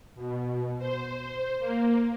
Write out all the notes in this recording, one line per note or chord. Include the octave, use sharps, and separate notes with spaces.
B2
C5
A#3